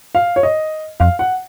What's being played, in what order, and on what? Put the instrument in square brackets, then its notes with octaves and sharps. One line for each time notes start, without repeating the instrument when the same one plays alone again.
[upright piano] F5
C#5
D#5
[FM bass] F2 [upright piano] F5
[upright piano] F#5